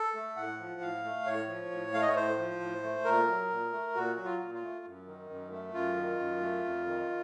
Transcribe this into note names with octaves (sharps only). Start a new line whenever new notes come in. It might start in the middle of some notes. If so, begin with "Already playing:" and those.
Already playing: A4
A3
A2 F#5
F3
A2 F5
A3
A2 C#5
F3
A2
A3 F5
D#5
C#5
A2 C5
F3
A2
A3
A#2 A#4
F#3
A#2
A3
A#2 F#4
F#3
F4
A#2
F4
A3
F#2
D#3
F#2
A3
F#2 F4
D#3
F#2
A3
F2
D#3